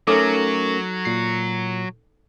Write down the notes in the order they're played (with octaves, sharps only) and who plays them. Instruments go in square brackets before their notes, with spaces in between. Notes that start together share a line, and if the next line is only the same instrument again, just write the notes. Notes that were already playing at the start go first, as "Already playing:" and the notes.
[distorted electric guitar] F#3 [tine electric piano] A3 C#4 A#4 [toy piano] D#4 A4 D6
[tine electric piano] A#2 C7